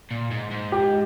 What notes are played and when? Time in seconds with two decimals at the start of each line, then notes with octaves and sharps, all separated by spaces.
0.11 A#2
0.31 G#2
0.51 G#2
0.72 G4